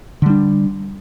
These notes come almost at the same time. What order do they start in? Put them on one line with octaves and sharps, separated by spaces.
D3 G3 D4